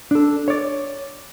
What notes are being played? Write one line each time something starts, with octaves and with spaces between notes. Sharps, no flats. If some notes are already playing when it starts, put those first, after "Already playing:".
D4 A4
C#5 D5